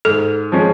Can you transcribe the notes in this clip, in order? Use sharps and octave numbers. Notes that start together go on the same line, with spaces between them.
G#2 A4
F3 G#3 C#4